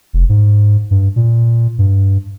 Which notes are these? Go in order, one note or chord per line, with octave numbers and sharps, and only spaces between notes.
F1
G#2
G2
A#2
G2